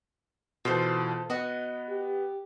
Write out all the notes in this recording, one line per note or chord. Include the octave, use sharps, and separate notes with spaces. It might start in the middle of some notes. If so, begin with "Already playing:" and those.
B2 E3 F4 A4 C5
B3 F#4 D#5
G4